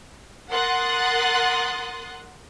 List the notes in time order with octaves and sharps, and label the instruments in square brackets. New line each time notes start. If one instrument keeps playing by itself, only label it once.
[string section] A#4 F#5 C6 D#6 F#6 A6